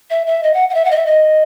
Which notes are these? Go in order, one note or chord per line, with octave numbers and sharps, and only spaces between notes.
E5
E5
D#5
F#5
F#5
E5
F#5
D#5
E5
D#5